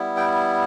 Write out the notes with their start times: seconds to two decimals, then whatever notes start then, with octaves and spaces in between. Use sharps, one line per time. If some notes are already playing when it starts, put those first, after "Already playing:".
Already playing: G3 B3 E4
0.17 G5